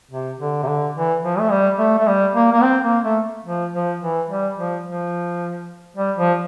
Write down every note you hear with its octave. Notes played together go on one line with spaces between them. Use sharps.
C3
D3
C3
D3
E3
F3
A3
G3
A3
A3
G3
A#3
A#3
C4
A#3
A3
F3
F3
E3
G3
F3
F3
G3
F3